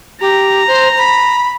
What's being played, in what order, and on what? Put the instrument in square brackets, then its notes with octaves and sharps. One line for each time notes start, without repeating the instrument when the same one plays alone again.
[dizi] G4 [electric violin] A#5
[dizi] C5
B5